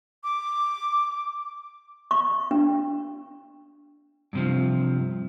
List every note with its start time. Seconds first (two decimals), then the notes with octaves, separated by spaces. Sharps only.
0.24 D6
2.11 C#6
2.51 D4
4.33 G2 C3 F3